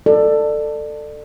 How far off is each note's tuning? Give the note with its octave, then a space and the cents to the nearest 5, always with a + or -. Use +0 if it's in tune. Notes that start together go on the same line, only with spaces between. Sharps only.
A4 +15 D5 +25